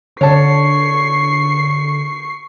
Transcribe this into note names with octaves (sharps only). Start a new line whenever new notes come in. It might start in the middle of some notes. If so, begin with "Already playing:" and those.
D3 C#5 A5 C#6 C7